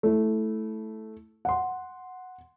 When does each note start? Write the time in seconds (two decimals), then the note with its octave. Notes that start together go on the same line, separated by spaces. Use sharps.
0.03 A3 E4
1.45 F#5 C6